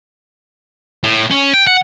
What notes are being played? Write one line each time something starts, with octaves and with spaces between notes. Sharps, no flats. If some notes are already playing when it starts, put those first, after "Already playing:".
A2
C#4
G5
F#5